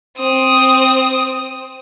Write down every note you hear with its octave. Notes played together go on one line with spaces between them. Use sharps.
C4 D#6